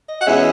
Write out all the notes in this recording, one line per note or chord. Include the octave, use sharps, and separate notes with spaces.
D#5
F#5
E2 B2 G#3 C#4 E5